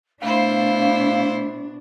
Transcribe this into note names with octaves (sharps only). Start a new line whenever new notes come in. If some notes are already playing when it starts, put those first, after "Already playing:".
B2 A3 D4 E4 C5 F5